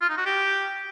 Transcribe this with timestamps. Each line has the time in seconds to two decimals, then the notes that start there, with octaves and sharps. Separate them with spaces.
0.01 F4
0.09 D#4
0.17 F#4
0.26 G4